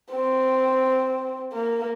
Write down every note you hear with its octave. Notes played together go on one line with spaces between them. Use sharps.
C4
A#3